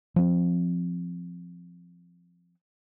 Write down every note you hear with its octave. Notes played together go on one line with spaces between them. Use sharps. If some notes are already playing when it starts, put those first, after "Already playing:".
F3 C4